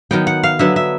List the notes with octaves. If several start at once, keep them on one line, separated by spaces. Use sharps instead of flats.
D#3 F#3 B3 G5
F#5
F5
D3 F#3 B3 E5
E5